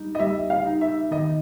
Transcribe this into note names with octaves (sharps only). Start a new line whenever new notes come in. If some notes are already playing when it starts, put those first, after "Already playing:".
Already playing: G3 D#4
D#5
G3 E5
F5
D#4
E5
D#3 D#5